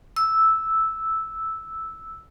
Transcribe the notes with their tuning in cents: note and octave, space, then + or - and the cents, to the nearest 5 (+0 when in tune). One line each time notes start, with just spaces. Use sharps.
E6 -5